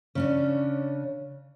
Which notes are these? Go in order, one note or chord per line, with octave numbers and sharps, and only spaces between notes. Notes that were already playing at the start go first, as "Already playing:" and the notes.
C#3 C#4 D4